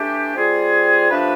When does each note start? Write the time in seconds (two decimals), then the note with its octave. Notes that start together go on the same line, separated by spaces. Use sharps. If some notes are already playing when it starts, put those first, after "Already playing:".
Already playing: E3 A3 D4 G4
0.35 G3 C4 F4 G#4
1.09 F3 A3 D4 G4 B4